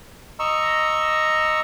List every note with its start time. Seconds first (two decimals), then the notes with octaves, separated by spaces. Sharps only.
0.39 D#5 A#5 C#6 E6